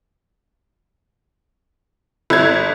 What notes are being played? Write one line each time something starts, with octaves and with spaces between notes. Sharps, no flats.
G1 E4 G#6